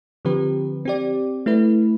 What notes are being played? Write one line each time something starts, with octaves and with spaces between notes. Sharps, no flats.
D3 F3 C4 G4 B4
C4 G4 D5
A3 E4 B4